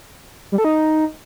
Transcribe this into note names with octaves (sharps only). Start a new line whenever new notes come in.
G3
A4
D#4